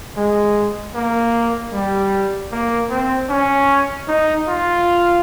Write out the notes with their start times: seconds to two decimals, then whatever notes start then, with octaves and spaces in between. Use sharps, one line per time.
0.17 G#3
0.94 A#3
1.73 G3
2.51 A#3
2.90 C4
3.29 C#4
4.08 D#4
4.47 F4